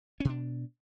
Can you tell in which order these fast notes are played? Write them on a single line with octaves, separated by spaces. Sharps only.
C#4 B2 D4